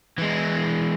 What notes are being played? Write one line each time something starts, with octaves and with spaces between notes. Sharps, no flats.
E3 G#3